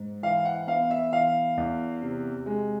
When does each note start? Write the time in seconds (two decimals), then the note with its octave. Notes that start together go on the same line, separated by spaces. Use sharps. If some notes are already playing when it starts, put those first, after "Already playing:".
Already playing: G#2
0.23 E3 F5
0.45 F#5
0.67 B3 F5
0.91 E5
1.12 E3 F5
1.57 E2
2.02 C3
2.46 G#3